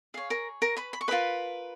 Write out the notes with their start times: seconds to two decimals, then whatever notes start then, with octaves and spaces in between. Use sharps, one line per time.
0.14 G#4 C#5 F5
0.30 A#4 A#5
0.62 A#4 A#5
0.77 B4 B5
0.93 B5
1.01 C#6
1.08 F4 A#4 B4 D#5 B5